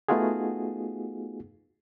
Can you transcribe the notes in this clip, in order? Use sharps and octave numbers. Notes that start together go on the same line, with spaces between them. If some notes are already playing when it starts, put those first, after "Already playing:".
A3 B3 D#4 F4 F#4 G#4